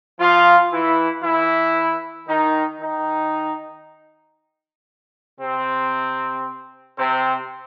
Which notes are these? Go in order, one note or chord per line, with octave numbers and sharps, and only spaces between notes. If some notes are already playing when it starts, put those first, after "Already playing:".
F3 F4
E3 E4
E3 E4
D#3 D#4
D#3 D#4
C3 C4
C3 C4